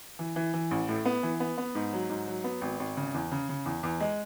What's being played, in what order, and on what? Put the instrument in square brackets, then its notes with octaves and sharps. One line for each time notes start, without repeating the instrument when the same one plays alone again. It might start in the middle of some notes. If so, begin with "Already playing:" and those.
[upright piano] E3
E3
E3
A1
A2
B3
E3
B3
B3
G#2
F#3
G#2
F#3
B3
G#1
G#1
C#3
E2
C#3
C#3
E2
E2
G#3